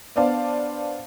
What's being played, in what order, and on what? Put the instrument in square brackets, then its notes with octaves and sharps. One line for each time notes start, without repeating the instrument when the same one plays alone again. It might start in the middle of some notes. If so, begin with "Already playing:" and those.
[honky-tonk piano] B3 D4 C5 D5 F5 A5